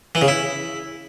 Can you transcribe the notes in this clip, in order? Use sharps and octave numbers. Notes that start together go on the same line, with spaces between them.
E3
C#3
E4